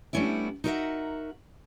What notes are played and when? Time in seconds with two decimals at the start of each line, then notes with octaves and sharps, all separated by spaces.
0.13 G3 A3 B3 C#4 D4 E4
0.64 D#4 F#4 A#4 B4 E5 F#5